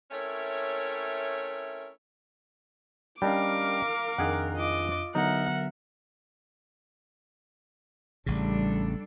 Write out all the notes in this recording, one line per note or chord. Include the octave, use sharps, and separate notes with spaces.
A3 C4 C#4 E4 A#4 C#5
G3 C#4 D4 A#4 D#5 F5 G5 D6
F2 D#3 D4 G#4 F#5 F#6
F4 D#5 D6
D3 F#3 B3 D#4 A#4 E5 F#5
A1 C#3 G3 D4 A4